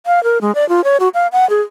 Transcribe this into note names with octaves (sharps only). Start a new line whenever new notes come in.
F5
A#4
G#3
D5
F4
C#5
F#4
F5
F#5
G#4